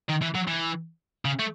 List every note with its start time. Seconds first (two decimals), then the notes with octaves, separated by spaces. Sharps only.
0.09 D#3
0.21 E3
0.35 F#3
0.47 E3
1.25 C#3
1.39 A3